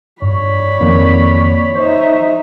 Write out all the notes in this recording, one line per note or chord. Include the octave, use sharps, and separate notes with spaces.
G2 C#5 D5 B5
F2 D#3 A#3
D#4 C5 E5